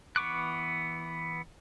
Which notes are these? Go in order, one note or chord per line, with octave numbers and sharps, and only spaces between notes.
E3 B3 C#6 D6 F#6